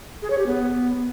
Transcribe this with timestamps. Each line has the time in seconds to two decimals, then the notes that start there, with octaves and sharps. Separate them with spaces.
0.22 G#4
0.30 C#5
0.38 G4
0.46 B3